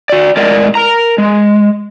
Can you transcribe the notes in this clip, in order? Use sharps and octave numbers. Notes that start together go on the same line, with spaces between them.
F#4 D5
A2 G#3 A#4 D5 D#5
A#4 A#5
G#3